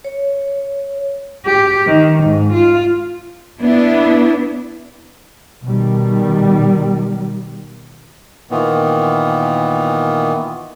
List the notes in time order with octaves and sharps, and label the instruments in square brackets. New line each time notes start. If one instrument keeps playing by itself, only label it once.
[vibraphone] C#5
[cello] G4
D#3
G#2
F4
[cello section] B3 D4 E4
[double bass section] B2 D#3 G3
[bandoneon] A#2 D#3 E3 B3